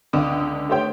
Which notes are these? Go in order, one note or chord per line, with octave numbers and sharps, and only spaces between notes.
C#2 D3 D6 D#6
A3 G4 C5 C#5 G5